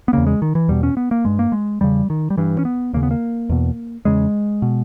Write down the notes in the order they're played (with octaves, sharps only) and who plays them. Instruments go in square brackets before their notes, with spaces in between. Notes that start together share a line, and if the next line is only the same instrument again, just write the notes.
[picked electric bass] B3
E2 C#3 A#3
G#3
D#3
E3
E2 B2 G3
C#4
B3
A#3
G2 G#3
A#3
G#3
E2 C#3 G3
D#3
G3
G2 E3
C#4
B3
D#2 C#3 A#3
B3
A#3
E2 B2
E2 C#3 G#3
B2